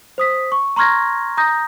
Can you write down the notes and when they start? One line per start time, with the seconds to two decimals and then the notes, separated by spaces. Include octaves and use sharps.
0.18 C5 D#6 B6
0.52 C#6
0.76 A#5 C6 C#6 F6 G#6 A#6
1.37 A#5 D#6 G6 A#6